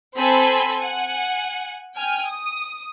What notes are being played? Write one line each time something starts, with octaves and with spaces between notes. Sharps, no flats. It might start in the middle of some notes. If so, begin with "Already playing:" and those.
C4 A4 C5 G#5 B5 C6
F#5 G#5
G5 G#5 F6
D#6